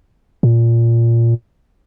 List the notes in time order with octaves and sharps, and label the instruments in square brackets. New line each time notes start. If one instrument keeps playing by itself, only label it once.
[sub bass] A#2